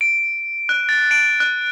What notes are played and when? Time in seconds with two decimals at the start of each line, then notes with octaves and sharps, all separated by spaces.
0.01 D7
0.69 F#6
0.89 A6
1.11 D7
1.40 F#6